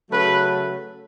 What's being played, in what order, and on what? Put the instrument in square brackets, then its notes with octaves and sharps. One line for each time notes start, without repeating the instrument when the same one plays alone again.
[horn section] C#3 F#3 A3 B4